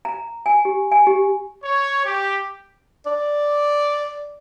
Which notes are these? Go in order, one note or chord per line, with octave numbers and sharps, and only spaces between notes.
A#5
G#5
G4
G#5
G4
C#5
G4
D5